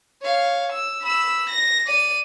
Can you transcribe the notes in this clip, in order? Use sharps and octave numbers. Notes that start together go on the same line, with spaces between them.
C#5 F5
E6
B5 E6
A#6
D5 D#7